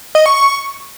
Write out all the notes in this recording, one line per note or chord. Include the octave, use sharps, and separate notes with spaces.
D#5
C#6
C#6